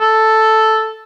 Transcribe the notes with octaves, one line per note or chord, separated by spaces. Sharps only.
A4